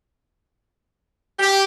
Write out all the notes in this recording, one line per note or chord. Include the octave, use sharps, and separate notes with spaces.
G4